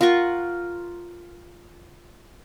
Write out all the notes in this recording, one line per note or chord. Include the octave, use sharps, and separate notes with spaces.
F4 A#4 F#5 C#6